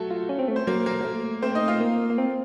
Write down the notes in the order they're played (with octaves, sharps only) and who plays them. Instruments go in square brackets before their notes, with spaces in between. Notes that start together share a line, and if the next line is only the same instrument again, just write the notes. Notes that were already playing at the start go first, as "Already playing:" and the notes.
Already playing: [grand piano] F#3 A3 F#4 A4
[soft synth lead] F4
C#4
C4
A3
[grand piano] C5
[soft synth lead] F#3 [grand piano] A#3 A#4
[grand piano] A#3 A#4
[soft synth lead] F#3
A3
[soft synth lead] A3 [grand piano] C4 C5
[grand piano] D#4 D#5
F4 F5
[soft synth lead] A#3
A#3
C4